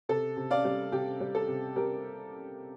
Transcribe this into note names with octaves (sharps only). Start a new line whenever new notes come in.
C3 A4
C3
D5 F5
G3
C3 G4
G3
A4
C3
G3 G4 A#4